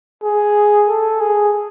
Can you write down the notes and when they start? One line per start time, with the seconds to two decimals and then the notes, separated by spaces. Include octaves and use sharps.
0.23 G#4
0.89 A4
1.21 G#4